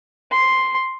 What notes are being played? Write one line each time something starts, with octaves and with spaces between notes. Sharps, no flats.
C6